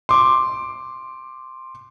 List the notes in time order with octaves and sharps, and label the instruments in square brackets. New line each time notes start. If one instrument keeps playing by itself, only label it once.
[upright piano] C6 D6